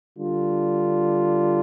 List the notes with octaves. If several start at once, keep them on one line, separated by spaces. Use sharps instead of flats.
D3 G3 D4 F4